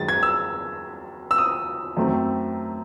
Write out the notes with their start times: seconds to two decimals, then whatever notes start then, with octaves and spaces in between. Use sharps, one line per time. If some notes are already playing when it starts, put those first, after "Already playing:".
Already playing: F#2 D#3 G#3 A6
0.09 G#6
0.23 E6
1.31 E6
1.38 D#6
1.97 F#2 D#3 A3 C4